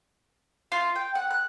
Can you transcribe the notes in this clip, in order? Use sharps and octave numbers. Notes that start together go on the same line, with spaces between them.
F4
G5
F#5
F#6